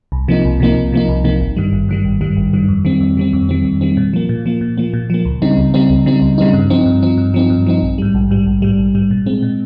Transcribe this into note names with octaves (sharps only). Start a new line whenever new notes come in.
C2
C3 F3 A#3 D#4
C2
C3 F3 A#3 D#4
C2
C3 F3 A#3 D#4
C2
C3 F3 A#3 D#4
G#1
G2 D#3 G3
G#1
G2 D#3 G3
G#1
G2 D#3 G3
G#1
G2 D#3 G3
F2
D#3 G3 C4
F2
D#3 G3 C4
F2
D#3 G3 C4
F2
D#3 G3 C4
A#2
F3 A#3
A#2
F3 A#3
A#2
F3 A#3
A#2
F3 A#3
C#2
C#3 G3 C4 D#4
C#2
C#3 G3 C4 D#4
C#2
C#3 G3 C4 D#4
C#2
C#3 G3 C4 D#4
G2
F3 C4 D#4
G2
F3 C4 D#4
G2
F3 C4 D#4
G2
F3 C4 D#4
A#1
G#2 G3
A#1
G#2 G3
A#1
G#2 G3
A#1
G#2 G3
A#2
G#3 C4
A#2